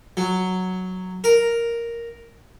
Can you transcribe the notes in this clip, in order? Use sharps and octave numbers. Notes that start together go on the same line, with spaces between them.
F#3
A#4